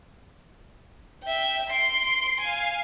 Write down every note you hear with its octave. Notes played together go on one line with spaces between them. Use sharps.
E5 G5
C6 D7
F5 G#5